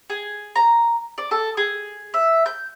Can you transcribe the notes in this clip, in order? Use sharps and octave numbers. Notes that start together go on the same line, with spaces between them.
G#4
A#5
D5
A4
G#4
E5
G6